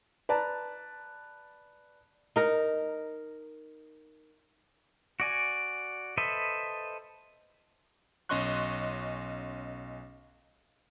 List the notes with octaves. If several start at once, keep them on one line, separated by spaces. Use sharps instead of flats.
B4 D5 A5 A#5
D#4 A#4
F#4 D5 G#5
A4 B4 C5 D#5 E5
B1 C#4 D#5 C6 C#6 F#6